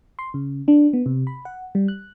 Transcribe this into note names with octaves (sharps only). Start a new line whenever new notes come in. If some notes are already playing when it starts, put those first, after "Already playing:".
C6
C#3
D4
B3
C3
B5
F#5
G3
F#6